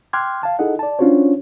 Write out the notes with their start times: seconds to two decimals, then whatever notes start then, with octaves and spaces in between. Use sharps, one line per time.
0.13 G5 C6 D6 F6 F#6 G#6
0.43 F5 A5
0.59 D#4 E4 G#4 A4 D#5 F#5
0.79 D5 A5
0.99 C#4 D4 F4 F#4 C5 C#5